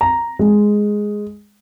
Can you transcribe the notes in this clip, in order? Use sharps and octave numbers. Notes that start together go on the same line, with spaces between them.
A#5
G#3